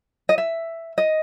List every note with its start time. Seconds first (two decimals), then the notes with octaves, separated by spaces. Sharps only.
0.29 D#5
0.38 E5
0.98 D#5